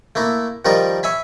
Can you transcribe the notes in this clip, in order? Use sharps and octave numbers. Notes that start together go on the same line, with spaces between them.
A3 A#3 E4
D#3 F3 G3 F4 A#4
C#5 E5 G#5 B5